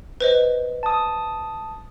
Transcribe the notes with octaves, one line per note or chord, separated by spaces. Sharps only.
B4 C5 D#5
A5 D#6